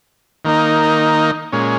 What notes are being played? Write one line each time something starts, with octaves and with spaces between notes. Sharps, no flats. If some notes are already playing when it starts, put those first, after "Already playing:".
D#3 A#3 D#4
A#2 G#3 C#4